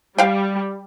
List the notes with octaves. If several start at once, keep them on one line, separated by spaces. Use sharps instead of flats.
G3 F5 G5